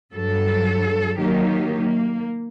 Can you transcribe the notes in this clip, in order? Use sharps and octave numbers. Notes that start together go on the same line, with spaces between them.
G2 F#3 A4
D#3 F#3 A#3 D#4 G4
A#3